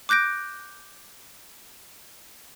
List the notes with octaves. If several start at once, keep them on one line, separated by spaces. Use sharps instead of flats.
D6 F#6 G6 A#6 D7